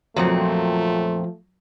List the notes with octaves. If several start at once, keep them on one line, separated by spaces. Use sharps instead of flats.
F2 A#2 F3 F#3 A3 C4